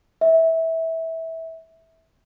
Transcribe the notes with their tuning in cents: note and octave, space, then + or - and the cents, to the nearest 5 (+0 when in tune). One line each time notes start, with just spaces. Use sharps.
E5 -20